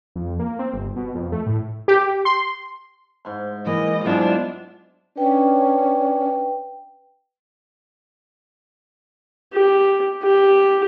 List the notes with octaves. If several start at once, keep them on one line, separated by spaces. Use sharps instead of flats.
F2
A#3
C4
G1
B2
F2
A3
A2
G4
C6
G#2 C6
E3 A#3 D#5
G#2 F#3 G#3 B3 D4 E4 F4
C#4 D4 B4 G5
G4
G4